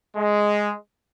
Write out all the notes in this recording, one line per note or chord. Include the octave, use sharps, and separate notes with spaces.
G#3